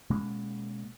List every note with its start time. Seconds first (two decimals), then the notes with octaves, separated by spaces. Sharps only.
0.10 B2 G#3 A#3 C#4